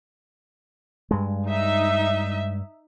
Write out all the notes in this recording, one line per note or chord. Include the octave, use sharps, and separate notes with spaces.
G2 G#3
D#4 E5